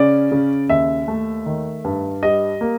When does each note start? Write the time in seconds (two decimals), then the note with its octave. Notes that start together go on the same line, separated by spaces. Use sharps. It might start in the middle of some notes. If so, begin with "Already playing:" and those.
Already playing: C#3 C#4 D5
0.32 C#3
0.69 D#2 E5
1.08 A3
1.46 D#3
1.84 G2
2.23 G3 D#5
2.61 A#3